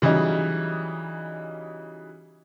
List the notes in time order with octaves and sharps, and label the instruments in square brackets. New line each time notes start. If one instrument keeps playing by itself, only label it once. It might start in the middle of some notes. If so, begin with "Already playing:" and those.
[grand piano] C#3 E3 F#3 G3 D#4